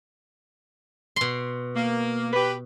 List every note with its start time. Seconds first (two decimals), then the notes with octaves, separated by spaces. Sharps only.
1.16 B2 C6
1.74 A#3
2.33 G4 B4